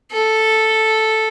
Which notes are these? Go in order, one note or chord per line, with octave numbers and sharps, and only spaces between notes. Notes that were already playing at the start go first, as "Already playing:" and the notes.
A4